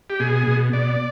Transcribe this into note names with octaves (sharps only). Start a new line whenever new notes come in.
G4
B2 G#4
B2
B2 D5